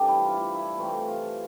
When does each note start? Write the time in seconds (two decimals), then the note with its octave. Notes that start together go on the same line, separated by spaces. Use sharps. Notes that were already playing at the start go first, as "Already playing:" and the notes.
Already playing: C3 E3 G3 A3 D4 G4 A4
0.08 E4
0.24 F4
0.31 E4
0.54 E4
0.77 C3 E3 A3 F4
1.08 F4